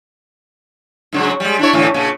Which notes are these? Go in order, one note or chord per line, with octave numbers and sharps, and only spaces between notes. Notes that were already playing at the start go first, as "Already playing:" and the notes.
G#2 C#3 F#3
G3 G#3
D4 E4 C#5
A2 D3 E3
A#2 C#3